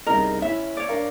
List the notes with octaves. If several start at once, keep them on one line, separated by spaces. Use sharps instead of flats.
C2 C#3 D#4 A#4
C#4 E4 E5
C#5 D5
D4 A#4 F5